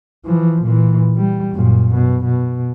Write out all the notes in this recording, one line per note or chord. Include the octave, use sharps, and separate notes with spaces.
E3 F3
A#2 E3
G3
F#2 A#2
B2
B2